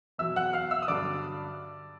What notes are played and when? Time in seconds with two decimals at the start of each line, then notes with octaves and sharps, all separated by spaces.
0.18 E2 B2 F#3 E5 E6
0.36 F#5 F#6
0.53 F5 F6
0.71 E5 E6
0.82 D#6
0.88 G2 D3 F#3 D5 D6